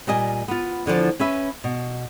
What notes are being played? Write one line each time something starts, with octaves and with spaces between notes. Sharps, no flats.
A#2 G3 D#5 G#5
B3 F4
E2 D3 D#3 F3
C#4 B4 E5
B2